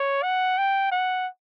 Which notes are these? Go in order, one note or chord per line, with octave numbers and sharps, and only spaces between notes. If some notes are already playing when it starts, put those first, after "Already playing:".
Already playing: C#5
F#5
G5
F#5